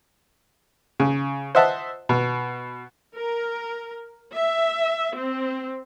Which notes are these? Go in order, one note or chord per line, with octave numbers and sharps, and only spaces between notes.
C#3
C5 D#5 E5 F#5 A5
B2
A#4
E5
C4